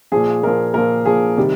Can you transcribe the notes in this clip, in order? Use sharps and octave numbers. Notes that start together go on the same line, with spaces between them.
A#2 F3 G#4
A#2 F3 A#4
A#2 F3 A#4
A#2 F3 G#4
C3 D#3 G3